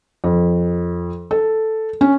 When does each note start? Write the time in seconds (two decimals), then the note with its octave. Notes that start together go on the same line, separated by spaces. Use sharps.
0.24 F2
1.31 A4
2.01 C#4